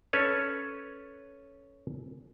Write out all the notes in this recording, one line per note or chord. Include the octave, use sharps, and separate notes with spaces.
C#4 A4 B4 C#5